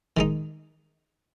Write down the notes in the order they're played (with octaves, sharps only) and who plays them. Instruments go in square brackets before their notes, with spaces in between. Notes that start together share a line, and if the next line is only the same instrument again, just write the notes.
[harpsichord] D#3 G#3 D#4